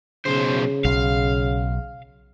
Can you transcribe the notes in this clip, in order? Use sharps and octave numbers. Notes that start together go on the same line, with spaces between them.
B1 C#3 C5
B1 F5